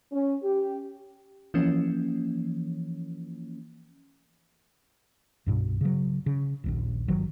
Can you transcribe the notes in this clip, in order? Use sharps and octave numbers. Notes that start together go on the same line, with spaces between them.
C#4
G4
E3 F3 A#3 C#4
C2 G2 B2
C#3 F#3
C#3
D#1 A#1 D#2
G1 D#3 F#3